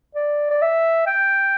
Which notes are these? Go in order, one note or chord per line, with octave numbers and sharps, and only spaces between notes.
D5
D5
E5
G5